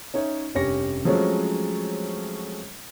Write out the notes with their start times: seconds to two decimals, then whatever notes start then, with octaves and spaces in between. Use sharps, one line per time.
0.14 C#4 D#4 C#5 E5
0.55 F1 G2 C#4 G4 A#6 C#7
1.05 F3 F#3 G#3 A3 C4 C#4